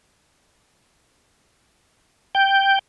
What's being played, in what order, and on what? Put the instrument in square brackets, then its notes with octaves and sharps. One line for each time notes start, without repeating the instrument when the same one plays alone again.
[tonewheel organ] G5